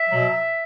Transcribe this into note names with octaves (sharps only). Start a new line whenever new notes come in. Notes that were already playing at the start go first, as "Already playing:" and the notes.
Already playing: E5
B2 F#3